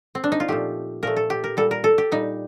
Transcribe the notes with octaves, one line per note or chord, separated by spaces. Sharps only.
C4
D4
D#4
F4
A#2 F3 A3 G4
A#2 F3 A3 A#4
A4
G4
A#4
A#2 G3 A4
A#4
A4
G4
A#2 G3 D#4